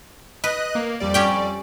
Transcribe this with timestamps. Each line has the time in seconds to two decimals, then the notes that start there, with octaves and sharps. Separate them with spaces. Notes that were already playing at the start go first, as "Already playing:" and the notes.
0.44 B4 D#5 F#6
0.75 A#3
1.00 F2 G3 D5
1.14 C#4 G4 G5